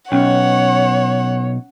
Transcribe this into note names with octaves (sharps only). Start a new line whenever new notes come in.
B1 C#4 C#5 F#5